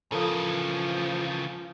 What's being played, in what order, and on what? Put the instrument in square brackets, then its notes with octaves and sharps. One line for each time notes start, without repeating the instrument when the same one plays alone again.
[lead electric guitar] C#3 E3 [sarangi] F3 [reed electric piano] A4 A#4 D#6